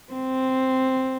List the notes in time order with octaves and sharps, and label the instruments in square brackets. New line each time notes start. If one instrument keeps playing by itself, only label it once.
[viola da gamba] C4